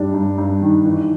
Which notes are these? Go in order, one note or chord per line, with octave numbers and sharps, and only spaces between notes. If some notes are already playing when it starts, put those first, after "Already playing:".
Already playing: G2 G3 D4
G2
G2
D#3
E3 D#4